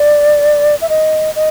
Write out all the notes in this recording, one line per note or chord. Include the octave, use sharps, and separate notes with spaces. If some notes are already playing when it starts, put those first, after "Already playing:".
Already playing: D5
E5
D#5
D#5